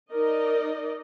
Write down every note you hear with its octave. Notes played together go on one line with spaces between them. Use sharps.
D#4 A#4 D5 D#5